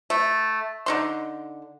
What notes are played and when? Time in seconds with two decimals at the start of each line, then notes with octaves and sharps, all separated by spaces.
0.10 A3
0.86 D3 D#4 C6